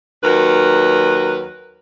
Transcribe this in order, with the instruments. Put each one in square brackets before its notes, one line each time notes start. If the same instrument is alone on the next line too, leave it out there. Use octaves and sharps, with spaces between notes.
[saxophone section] D#2 F#3 A#4 B4